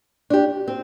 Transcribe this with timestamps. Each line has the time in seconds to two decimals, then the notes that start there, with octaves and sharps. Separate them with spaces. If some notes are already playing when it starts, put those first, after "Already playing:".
0.30 D4 G4
0.68 C4